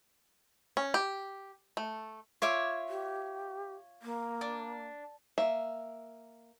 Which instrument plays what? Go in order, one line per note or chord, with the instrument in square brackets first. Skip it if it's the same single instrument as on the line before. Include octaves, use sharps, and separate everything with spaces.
[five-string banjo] C#4
G4
A3
[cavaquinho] F4 E5 D6 [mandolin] C#5
[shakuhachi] G4
A#3
[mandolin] D4
[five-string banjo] A#3 E5